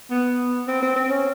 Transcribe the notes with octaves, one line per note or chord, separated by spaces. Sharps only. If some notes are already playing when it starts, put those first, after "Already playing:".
B3
C4
C4
C4
C#4